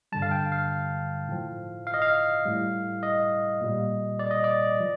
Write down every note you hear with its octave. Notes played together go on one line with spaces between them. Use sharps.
G2 D3 G3 A5
F5
G5
F5
A2 F3
F5
D#5
F5
A2 G3
D#5
A#2 G3
D5
D#5
D5
F3